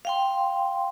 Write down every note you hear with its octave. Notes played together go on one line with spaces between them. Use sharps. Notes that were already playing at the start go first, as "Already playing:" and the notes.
F5 G5 C6